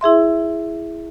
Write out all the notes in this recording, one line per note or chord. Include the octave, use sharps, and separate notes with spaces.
E4 G#4 E5 C6